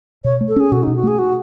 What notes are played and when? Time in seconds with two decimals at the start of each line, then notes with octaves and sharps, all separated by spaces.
0.24 B2 C#5
0.41 A3
0.48 A4
0.56 C#4 G#4
0.72 B2 F#4
0.83 B2 D#4
0.96 F#4
1.03 A3 G#4
1.19 F#4